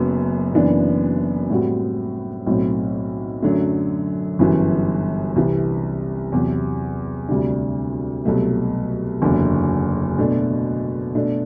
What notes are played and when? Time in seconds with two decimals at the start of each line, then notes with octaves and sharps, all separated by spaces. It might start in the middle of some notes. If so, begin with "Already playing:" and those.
Already playing: F#1 F#2 F#3 B3
0.53 F#1 F#2 E3 B3 D4
1.50 A2 G3 C4 F#4
2.46 B1 A2 F#3 C4
3.42 F#2 D3 F#3 A3
4.39 G1 F#2 E3
5.36 C2 C3 E3
6.32 E2 C3 F#3
7.29 D2 C3 G3 D4
8.25 C2 B2 F#3 A3
9.22 F#1 E2 D3
10.18 B2 A3 D4
11.15 B2 A3 D4